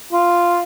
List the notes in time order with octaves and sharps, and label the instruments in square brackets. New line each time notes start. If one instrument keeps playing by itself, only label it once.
[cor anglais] F4